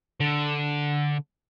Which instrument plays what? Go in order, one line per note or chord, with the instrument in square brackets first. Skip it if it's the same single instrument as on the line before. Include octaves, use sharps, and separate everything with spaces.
[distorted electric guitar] D3